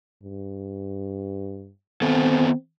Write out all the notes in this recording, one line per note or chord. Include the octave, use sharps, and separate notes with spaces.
G2
D#3 B3 C4 A4